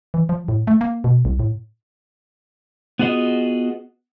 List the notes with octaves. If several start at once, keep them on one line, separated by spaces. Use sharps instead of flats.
E3
F3
A2
A3
A#3
B2
C2
A2
B3 F4 F#4 G#4 D#5